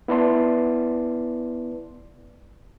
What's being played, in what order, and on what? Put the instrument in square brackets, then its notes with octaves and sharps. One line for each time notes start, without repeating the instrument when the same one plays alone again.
[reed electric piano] B3 E4 B4 D5 A5 C6